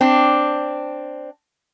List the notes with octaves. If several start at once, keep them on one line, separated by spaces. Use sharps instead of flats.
C4 D4